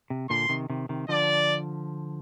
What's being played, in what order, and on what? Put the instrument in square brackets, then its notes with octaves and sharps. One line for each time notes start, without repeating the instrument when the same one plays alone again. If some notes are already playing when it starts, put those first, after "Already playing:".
[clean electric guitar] C3
[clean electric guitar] A#2 D3 [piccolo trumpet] C6
[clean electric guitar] C3 D#3
C3 D#3
C3 D#3
[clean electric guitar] D3 F3 [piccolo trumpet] D5